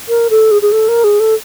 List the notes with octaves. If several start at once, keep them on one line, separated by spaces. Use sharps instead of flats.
A#4
A4
G#4
G#4
A4
A#4
G#4
A4